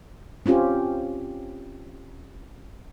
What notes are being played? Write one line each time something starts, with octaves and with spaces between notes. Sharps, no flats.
C4 C#4 F4 G4